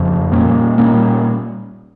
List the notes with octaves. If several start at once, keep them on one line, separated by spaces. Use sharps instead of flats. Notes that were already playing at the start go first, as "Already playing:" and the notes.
Already playing: F2 C#3 F3
A#2 G3 A#3 C#4
A#2 G3 A#3 C#4